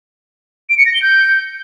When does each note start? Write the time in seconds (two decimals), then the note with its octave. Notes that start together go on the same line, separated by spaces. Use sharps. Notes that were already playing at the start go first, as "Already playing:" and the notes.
0.70 D7
0.78 C#7
0.86 A#6
0.94 G7
1.02 G6